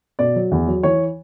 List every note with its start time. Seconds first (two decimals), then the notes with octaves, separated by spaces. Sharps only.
0.19 B2 D5
0.36 F#3
0.52 E2
0.67 F#3
0.83 E3 C#5